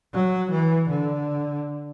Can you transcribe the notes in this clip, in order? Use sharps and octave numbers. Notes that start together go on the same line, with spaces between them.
F#3
E3
D3